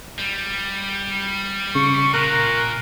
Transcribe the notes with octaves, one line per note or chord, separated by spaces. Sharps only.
G3
C#3 C#6
A#2 A#4 F#6